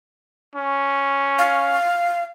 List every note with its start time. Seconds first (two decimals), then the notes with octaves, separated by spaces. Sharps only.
0.55 C#4
1.39 F5